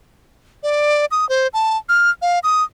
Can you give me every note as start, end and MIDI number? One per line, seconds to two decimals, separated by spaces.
0.63 1.06 74
1.11 1.28 87
1.29 1.48 72
1.53 1.77 81
1.89 2.10 89
2.22 2.39 77
2.43 2.63 87